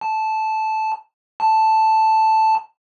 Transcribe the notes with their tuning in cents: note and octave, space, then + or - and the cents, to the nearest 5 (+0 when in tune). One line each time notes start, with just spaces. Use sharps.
A5 -10
A5 +0